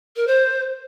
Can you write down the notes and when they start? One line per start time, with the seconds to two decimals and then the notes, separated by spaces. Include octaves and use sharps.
0.16 A#4
0.27 C5